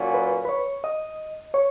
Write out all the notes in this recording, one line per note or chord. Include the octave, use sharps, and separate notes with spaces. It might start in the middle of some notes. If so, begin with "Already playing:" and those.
Already playing: A#2 F#3 C#4
B4
B4
C#5
D#5
C#5